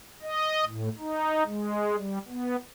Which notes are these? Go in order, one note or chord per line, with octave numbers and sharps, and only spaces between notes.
D#5
A2
D#4
G#3
G3
B3